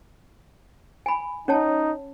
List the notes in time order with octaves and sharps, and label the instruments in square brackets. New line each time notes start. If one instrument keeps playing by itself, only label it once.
[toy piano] G#5 B5
[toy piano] C#4 C#5 A5 [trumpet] D#4